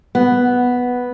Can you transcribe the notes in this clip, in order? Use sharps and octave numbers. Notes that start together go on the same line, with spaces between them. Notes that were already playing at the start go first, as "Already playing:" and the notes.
B3